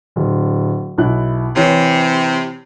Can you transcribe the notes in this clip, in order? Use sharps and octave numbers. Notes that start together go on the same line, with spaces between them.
D1
B1 E4 F#6
C3 E3 C#5 C7